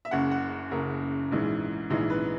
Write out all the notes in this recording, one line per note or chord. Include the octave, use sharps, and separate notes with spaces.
E5
F#1 F#2 C#3 F#5
F#5
F#1 F#2 C#3 A#4
A#1 G#2 E3 G#3
A#1 G#2 E3 G#3 D#5
B4